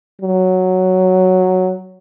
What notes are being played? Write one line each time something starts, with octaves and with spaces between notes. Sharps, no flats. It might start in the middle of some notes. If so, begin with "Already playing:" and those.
F#3